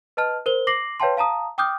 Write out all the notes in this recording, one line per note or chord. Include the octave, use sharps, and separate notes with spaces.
B4 D#5 A5 F6
A#4 C5 G7
D6 A#6 C7 F#7
B4 C#5 F5 G5 A5 C6
F5 A5 A#5 D#6
G5 D6 D#6 F6 G6